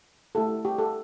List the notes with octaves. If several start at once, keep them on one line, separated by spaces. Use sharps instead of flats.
A3 E4 G4 A4
G4
A4